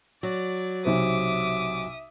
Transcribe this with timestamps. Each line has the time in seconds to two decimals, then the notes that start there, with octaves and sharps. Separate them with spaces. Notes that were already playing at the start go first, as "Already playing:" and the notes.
0.23 F#3 D5
0.85 B1 C3 C5 E5 D6 D#6